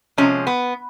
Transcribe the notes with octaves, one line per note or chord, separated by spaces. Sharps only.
C3 F3 G#3 C#4
B3